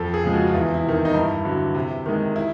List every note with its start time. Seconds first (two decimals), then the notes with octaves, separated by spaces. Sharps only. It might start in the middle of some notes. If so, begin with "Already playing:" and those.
Already playing: F2 A4
0.14 G#4
0.24 C#3 F3 G#3
0.34 F#4
0.47 F4
0.54 E2 E4
0.74 E4
0.84 C3 D#3
0.94 E4
1.05 D#4
1.14 G2 E4
1.45 D3 F#3
1.75 C3
2.06 D#3 G#3
2.36 E4